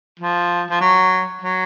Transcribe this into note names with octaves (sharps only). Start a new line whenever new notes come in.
F3
F3
F#3
F#3